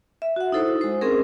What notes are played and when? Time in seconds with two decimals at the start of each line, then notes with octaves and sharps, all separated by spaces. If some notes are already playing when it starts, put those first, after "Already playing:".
0.22 E5
0.36 F#4 F#5
0.52 D#4 E4 A4 C5
0.68 D#6
0.81 G#3 C5
1.01 C4 C#4 G#4 A#4